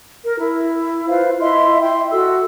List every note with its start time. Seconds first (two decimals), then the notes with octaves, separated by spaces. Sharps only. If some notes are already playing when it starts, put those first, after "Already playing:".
0.25 A#4
0.37 E4
1.09 F4 B4 C5 F5
1.40 E4 D#5 E5 C6
1.82 E5 G5 C6
2.11 F#4 A4 E6